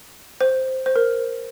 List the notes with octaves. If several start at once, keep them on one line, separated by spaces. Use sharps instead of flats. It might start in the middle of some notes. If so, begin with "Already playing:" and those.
C5
C5
A#4